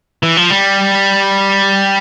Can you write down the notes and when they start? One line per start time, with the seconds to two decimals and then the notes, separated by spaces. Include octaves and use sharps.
0.23 E3
0.37 F3
0.51 G3